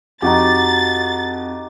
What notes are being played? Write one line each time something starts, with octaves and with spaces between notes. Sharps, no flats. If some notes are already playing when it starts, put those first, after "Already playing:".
F2 D#4 F#4 G4 A6